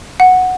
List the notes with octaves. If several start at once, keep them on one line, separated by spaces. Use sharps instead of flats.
F#5